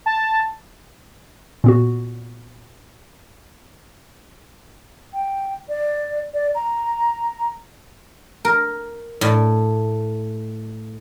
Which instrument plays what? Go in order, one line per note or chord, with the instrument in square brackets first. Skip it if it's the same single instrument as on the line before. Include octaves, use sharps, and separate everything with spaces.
[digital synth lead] A5
[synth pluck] A#2 B3 F#4
[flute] G5
D5
D5
A#5
[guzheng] A#4
A2